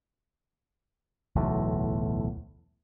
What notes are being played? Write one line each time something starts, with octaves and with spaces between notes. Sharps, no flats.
D1 B1 E2 A2